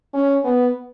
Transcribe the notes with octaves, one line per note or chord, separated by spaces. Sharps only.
C#4
B3